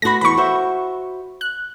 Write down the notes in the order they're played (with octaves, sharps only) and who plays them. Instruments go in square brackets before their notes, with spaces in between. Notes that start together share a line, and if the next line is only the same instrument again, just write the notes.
[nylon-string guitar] A3 B3 F#4 [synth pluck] B5 A#6
[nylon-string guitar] E2 E3 [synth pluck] B5 C#6
[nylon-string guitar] F#4 C5 E5
[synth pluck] F#6